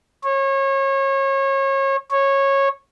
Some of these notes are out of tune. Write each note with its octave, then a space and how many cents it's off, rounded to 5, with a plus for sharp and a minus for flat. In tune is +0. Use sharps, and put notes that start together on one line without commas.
C#5 -30
C#5 -15